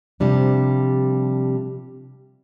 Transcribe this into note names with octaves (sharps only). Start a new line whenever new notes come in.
C3 F3 G3 D4